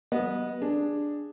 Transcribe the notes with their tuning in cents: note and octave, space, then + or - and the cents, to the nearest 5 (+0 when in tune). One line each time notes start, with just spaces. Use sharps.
F#3 +45 B3 -20 D#5 +0
D4 +0 G#4 -5